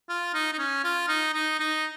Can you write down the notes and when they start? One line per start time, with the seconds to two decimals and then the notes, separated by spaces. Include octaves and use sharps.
0.09 F4
0.34 D#4
0.53 D#4
0.58 C#4
0.84 F4
1.09 D#4
1.34 D#4
1.59 D#4